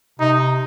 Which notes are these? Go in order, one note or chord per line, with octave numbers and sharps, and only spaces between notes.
C3 D#4